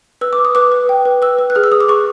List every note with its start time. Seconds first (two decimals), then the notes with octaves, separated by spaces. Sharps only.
0.21 B4 E6
0.33 D6
0.38 B4
0.45 D#6
0.55 B4 D6
0.72 B4
0.89 G5
1.05 B4
1.22 B4 E6
1.39 B4
1.50 F#6
1.55 G#4 F6
1.64 E6
1.72 G#4 D#6
1.80 D6
1.89 G#4 C#6